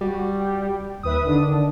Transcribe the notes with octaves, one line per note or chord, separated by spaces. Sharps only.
G3 F#4
G5
D#2 B4 E5 D#6
D3 D#3 D4